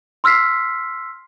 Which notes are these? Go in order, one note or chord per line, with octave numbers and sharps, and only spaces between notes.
C6 E6 F6 B6 C7